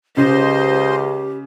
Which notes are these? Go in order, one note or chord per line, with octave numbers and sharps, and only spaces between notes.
C#2 C#3 G4 C5 D#5 C6